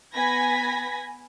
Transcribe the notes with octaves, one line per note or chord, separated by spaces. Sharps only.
B3 G#5 B5 G#6 A#6 B6